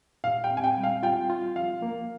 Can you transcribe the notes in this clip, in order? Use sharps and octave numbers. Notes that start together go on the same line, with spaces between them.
A#2 F5
G5
C4
G#5
G5
G3
F5
F4 G5
F4
F3 F5
A#3